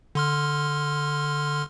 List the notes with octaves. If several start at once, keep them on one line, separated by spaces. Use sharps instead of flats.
D3 C6 F6